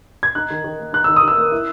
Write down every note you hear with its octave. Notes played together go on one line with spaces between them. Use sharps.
G#6
D#4 F#6
D#3
D#3
A#3
D#4 F#6
D#3 E6
D#6
D#3 E6
A#3
E4